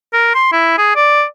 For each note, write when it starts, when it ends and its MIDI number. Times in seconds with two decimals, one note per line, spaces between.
0.13 0.31 70
0.34 0.50 84
0.52 0.76 64
0.78 0.91 68
0.96 1.24 74